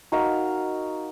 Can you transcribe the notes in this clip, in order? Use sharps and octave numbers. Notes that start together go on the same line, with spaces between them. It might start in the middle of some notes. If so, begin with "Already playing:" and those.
D#4 F#4 A#4 F5